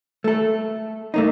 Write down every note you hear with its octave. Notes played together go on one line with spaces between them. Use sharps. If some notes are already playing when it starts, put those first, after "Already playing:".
A3 A4
A3 A#3 D#4